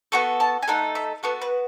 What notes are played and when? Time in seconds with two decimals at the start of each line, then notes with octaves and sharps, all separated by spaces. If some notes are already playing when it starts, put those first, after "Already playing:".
0.12 B3 F#4 A4 C#6
0.40 A5
0.62 G#5
0.68 A3 D#4 A4 F#5
0.95 E5
1.23 B3 F#4 A4 F#5
1.41 B4